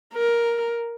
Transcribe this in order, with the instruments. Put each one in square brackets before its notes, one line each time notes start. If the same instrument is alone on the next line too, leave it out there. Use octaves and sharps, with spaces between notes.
[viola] A#4